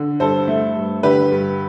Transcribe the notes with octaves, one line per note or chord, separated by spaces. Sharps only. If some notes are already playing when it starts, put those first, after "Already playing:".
Already playing: D3
G2 A4 C5
A3
G2
D3 G4 B4
G2